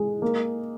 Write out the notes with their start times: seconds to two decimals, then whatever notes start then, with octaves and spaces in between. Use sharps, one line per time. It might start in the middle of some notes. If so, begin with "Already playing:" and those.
Already playing: G#3
0.22 A#3